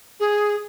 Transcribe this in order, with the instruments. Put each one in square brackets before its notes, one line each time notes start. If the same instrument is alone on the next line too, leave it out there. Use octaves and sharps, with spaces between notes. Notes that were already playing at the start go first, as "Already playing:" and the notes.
[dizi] G#4